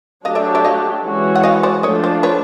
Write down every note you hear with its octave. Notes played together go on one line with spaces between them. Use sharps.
F#3 A3 D4 G4 D#5 F5
D5 E5
D5 E5
D#5 F5
E3 G#3 C#4 F#4
F#5
D#5 F5
C5 D5
F3 A3 D4 F4 C#5 D#5
C5 D5
B4 C#5